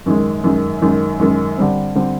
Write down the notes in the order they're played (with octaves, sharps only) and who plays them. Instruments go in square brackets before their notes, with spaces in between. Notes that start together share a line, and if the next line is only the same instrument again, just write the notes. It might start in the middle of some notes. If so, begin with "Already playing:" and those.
[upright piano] F#2 D#3 G#3
F#2 D#3 G#3
F#2 D#3 G#3
F#2 D#3 G#3
D3 G3 C4
D3 G3 C4